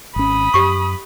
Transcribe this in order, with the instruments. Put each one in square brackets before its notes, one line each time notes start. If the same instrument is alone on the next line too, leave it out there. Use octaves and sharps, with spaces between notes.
[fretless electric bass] G#1 C#4 [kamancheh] B5 D#6
[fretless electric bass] F#2 [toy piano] G4 C#6